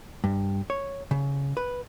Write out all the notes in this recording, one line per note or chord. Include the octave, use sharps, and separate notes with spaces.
G2
C#5
C#3
B4